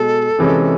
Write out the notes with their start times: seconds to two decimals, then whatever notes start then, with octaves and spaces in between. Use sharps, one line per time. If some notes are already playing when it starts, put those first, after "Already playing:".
Already playing: B2 G#3 A4
0.39 C3 E3 G#3 C#4